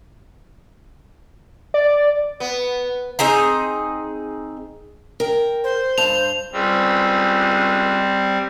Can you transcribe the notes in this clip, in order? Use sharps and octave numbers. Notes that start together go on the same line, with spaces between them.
D5
B3
C4 D#4 G#4 A#5
A#4 G5
C5
G2 A5 F7
C#2 G3 C4